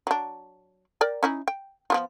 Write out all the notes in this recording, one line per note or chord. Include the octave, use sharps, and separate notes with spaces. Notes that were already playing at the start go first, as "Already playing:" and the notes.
F#3 D4
A#4 D5 G5
C#4 D#4 E4
G5
F3 B3 F4